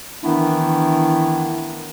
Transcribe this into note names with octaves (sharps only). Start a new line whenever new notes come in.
D#3 E3 A3 B3 D4 E4